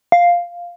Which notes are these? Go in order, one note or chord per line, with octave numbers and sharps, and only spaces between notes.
F5